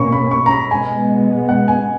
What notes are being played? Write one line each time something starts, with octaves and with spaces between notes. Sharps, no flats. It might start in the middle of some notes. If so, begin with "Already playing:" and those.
Already playing: B2 A#3 C#4 B5 C#6
B5
C#6
A#5
B5
B2 G#3 B3 G#5
F#5
G#5